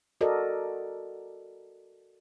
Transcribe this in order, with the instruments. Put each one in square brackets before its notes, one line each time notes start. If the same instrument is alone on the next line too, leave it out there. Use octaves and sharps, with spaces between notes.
[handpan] F#4 A4 A#4 D5 D#5